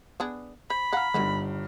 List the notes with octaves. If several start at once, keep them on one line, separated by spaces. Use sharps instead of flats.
B3 D4 G#4
C5 B5
F5 F#5 A#5 F6
G1 G2 D3 D#3 B3